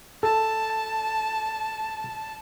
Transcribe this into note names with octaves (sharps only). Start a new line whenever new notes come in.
A4 A5